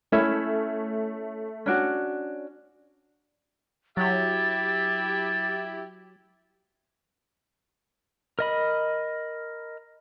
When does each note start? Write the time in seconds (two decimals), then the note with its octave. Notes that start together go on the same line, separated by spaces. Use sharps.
0.12 A3 C#4 E4 E5
1.66 C#4 D4 F#4
3.97 F#3 E4 G4 E5 A6
8.39 A#4 D#5 B5